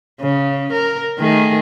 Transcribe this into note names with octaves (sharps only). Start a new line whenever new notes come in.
C#3
A#4
D#3 A3 G#4